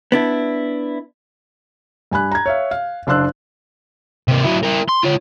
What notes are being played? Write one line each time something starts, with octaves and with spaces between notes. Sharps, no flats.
B3 D4 E4
G2 G#5 B5 F#6
A#5 G#6
C#5 E5 F5
F5
F#1 D4 F5 C6 E6 F#6
C3 A#3
F#3 E4
E4 A#4
C6
F4 C#5